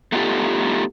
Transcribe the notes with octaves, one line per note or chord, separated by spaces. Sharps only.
A3 B3 D#4 F4 G4 A4